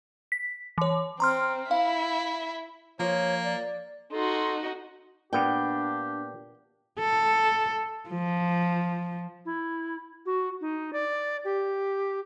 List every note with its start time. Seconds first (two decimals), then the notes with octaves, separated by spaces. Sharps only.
0.32 B6
0.78 E3 C#5
1.20 C4 A#5 C6 F6
1.71 E4 E5 F5
2.99 F3 A#3 C#5
3.44 D5
4.12 D#4 F#4 A4 C6
5.33 A#2 B3 D4 G4 G5
6.99 A4
8.10 F3
9.45 E4
10.26 F#4
10.61 D#4
10.93 D5
11.45 G4